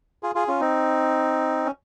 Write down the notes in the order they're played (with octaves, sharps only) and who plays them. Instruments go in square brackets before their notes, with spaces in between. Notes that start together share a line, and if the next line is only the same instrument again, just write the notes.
[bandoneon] F4 G#4
F4 G#4
C#4 F4
C4 D#4
C#4